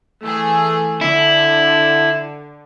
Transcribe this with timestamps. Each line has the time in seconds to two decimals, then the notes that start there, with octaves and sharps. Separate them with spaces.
0.22 E3 A3 G#4
1.01 D3 E4